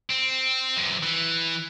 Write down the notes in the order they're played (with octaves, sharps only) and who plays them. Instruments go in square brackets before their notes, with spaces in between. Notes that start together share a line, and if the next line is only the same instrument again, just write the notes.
[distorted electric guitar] C4
F#2 E3
E3